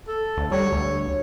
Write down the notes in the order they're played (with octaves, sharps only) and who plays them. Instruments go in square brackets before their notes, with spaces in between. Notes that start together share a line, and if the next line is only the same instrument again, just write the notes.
[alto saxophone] A4
[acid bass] D2
[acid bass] G3 [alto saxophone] C#5
[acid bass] D2